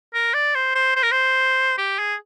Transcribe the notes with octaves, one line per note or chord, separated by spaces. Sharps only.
A#4
D5
C5
C5
C5
A#4
C5
G4
G#4